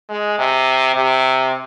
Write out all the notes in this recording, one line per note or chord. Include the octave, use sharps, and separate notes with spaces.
G#3
C3
C3